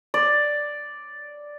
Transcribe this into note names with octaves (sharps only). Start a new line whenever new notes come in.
D5